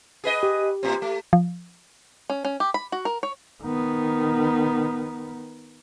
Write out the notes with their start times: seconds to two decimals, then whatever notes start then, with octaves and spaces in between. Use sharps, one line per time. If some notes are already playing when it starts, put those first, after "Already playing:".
0.24 G#4 B4 D#5
0.43 G4
0.83 A2 C4
1.02 A3
1.33 F3
2.30 C#4
2.45 C#4
2.60 G4
2.74 B5
2.92 F#4
3.05 A#4
3.23 C#5
3.63 D#3 B3